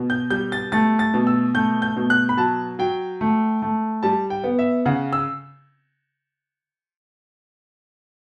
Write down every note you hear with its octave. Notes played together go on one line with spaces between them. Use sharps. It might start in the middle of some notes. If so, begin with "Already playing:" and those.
Already playing: B2
G6
G3 G6
A6
A3 A6
A6
B2
E6
A3 G6
G6
B2
F#6
B5
F#3 A5
F#3 G5
A3
A3
G3 A5
G5
B3
E5
C#3 F#5
E6